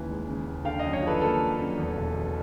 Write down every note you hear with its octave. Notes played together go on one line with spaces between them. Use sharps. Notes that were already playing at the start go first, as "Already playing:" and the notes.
Already playing: D#2 C#3 E3
G#3
C#3
D#2
D3 F5 G5
F#2 D#5 F5
C#5 D#5
F3 A4 B4
A#3 A4 B4
D3
F#2
E2
E1
B2